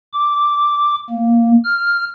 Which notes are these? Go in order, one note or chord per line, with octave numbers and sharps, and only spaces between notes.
D6
A#3
F6